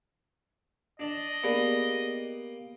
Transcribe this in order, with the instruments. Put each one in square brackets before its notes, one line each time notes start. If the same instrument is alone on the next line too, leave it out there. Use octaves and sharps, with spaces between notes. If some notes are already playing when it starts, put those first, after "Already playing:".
[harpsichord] D4 D5 A5 [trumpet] D#5
[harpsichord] A#3 G4 B4 [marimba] B3 G#4 D5